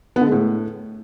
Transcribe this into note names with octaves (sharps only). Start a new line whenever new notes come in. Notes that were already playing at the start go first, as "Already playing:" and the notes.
B3
D3
G#3
A2